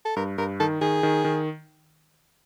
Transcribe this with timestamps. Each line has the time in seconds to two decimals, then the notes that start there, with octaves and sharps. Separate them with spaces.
0.06 A4
0.16 G2 A#4
0.38 G2 A#4
0.60 D#3 A4
0.81 D#3 G#4
1.03 D#3
1.25 D#3